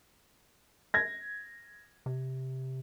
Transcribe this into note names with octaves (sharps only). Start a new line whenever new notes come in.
G#6 A#6
C3